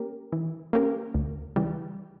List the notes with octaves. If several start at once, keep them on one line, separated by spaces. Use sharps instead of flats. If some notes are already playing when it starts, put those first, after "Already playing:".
Already playing: A#3 C#4 G4 A#4
E3
A#3 C#4 G4 A#4
D2
C#3 E3 G3